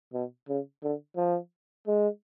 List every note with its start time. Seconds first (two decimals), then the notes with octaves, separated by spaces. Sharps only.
0.13 B2
0.49 C#3
0.83 D3
1.17 F3
1.87 G#3